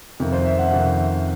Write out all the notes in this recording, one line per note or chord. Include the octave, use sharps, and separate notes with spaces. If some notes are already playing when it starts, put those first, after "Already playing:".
F2 C3 D#3
C5
E5
F#5
F2 C3 D#3